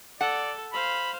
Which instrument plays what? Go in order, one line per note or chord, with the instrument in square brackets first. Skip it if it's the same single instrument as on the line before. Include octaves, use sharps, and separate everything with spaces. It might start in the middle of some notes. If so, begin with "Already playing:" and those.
[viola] A4 [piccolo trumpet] D5 [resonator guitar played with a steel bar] F#5
[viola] C5 F5 [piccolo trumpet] B5